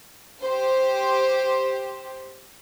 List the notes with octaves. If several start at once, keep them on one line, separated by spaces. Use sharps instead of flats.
G4 C5